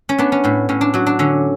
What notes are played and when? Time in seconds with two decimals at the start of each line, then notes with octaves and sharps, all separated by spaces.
0.09 C#4
0.18 B3 D4
0.32 C#4
0.44 A2 B3
0.69 A2 C#4
0.81 D4
0.94 F#3 F#4
1.06 D4
1.19 D3 C#4